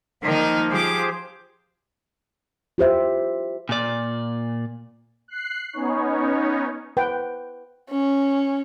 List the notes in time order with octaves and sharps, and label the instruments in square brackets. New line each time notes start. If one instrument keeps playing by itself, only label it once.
[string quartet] D#3 D#4 [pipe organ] F3 A#3
[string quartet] F3 D6 [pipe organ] G4 G#4 C5
[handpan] F4 G4 C5 E5
[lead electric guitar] A#2 D5
[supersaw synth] F#6 C7
B3 C#4 D#4 C#5
[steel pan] B4 F#5 G5
[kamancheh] C#4